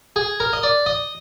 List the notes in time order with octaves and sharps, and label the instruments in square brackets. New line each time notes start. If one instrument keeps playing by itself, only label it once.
[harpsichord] G#4
A#4
D#5
D5
D#5